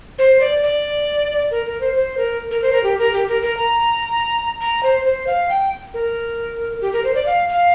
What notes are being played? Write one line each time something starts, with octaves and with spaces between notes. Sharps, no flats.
C5
D5
D5
A#4
A#4
C5
C5
A#4
A#4
C5
A#4
G4
A#4
G4
A#4
A#4
A#5
A#5
C5
C5
F5
G5
A#4
G4
A#4
C5
D5
F5
F5